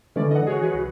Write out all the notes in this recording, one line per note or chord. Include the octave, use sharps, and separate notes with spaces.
D3 E3 G#3 C#4 D5
D#5 F#5
F#4 G#4 C#5
E3 G#4 B4
C2 E3